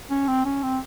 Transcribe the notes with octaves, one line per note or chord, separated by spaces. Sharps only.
C#4
C4
C#4
C4